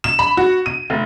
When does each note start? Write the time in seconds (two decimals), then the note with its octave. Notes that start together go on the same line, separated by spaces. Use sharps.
0.04 E7
0.19 B5
0.37 F#4
0.66 D#7
0.90 F1